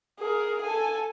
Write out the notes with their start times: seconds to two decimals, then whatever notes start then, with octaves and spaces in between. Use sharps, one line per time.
0.19 G#4 A#4
0.63 A4 G#5